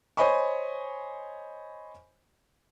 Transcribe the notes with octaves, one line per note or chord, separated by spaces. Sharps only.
C5 C#5 D#5 G#5 B5 C#6